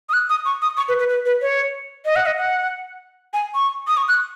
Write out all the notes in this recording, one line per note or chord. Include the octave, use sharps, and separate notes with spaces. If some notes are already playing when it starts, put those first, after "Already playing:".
D#6
F#6
D#6
C#6
D#6
C#6
B4
B4
B4
B4
C#5
D#5
F#5
D#5
F#5
G#5
C#6
D#6
C#6
F#6